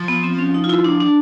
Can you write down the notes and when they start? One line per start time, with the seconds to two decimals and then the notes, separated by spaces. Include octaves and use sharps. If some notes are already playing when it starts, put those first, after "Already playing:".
Already playing: F3
0.08 B3
0.23 C4
0.39 C#4
0.54 D#4
0.64 F4
0.69 E4
0.84 D4
1.00 D4